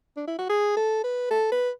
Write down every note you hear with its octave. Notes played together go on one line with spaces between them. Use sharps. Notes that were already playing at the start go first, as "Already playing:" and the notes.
D4
E4
F#4
G#4
A4
B4
A4
B4